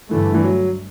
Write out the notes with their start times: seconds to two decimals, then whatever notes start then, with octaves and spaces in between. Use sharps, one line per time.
0.11 G2 D3 E3 A3
0.34 E3
0.44 F#3